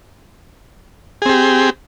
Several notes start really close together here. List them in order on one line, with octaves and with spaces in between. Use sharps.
G#4 C4 G4